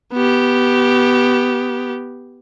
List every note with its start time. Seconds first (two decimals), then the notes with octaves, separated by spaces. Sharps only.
0.13 B3 G4